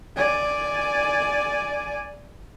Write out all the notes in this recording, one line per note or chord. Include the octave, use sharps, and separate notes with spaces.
D5 G#5